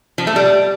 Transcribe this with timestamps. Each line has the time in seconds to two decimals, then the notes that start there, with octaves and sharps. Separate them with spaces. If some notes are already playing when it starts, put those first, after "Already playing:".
0.18 F3
0.27 A3
0.36 G3